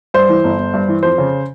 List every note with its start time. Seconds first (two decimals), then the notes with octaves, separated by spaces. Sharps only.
0.14 G2 C5
0.29 E3
0.44 G1
0.59 G1
0.74 G2
0.88 E3
1.03 F2 C5
1.18 C#3